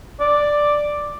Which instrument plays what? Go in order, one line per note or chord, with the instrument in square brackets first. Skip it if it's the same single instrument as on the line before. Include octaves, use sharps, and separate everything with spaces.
[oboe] D5